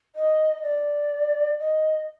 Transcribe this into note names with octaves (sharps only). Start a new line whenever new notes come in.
D#5
D5
D#5